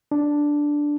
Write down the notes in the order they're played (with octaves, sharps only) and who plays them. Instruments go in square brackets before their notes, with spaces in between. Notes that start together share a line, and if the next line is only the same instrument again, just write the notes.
[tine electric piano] D4